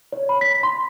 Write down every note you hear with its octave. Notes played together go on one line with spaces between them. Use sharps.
C#5
B5
B6
C6